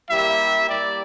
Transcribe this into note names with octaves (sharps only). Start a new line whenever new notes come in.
G3 A#3 E4 G4 E5
G3 A#3 E4 G4 D5